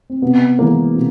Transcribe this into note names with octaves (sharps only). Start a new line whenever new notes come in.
C4
C3 B3
E3 G#3 A#3
C3